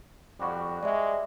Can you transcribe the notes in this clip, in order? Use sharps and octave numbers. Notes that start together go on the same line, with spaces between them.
F2 G3 F#4
G#3 D5 E5